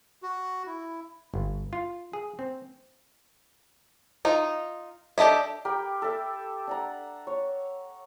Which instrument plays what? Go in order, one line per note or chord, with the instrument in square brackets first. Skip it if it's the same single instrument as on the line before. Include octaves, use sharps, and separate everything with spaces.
[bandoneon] F#4
E4
[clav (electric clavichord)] G1
F4
G#4
C4
[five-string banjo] D#4 F4
D4 G4 A4 D#5 E5
[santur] G4 A#4 G5 B5
A4 E5
D4 F#5 A#5
C#5